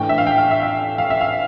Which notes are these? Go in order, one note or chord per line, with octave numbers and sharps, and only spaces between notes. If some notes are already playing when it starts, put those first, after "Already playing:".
Already playing: A2 E3 A3 D4 G5
E5
F5
G5
F5
E5
E5
F5
E5
F5